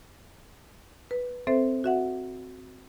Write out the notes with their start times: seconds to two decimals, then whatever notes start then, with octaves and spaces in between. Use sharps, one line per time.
1.11 B4
1.47 C4 A4 C5 E5
1.84 F#4 E5 F#5